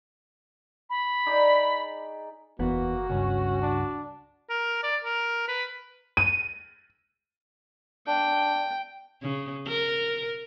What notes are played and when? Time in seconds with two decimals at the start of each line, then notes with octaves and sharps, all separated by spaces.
0.90 B5
1.26 D#4 G#4 D5
2.59 F#1 E2 A#3 B3 F#4
3.09 C#2 G2 C#4
3.62 D4
4.49 A#4
4.83 D5
5.04 A#4
5.48 B4
6.17 D#7
8.07 D4 G5
9.22 C#3
9.67 A#4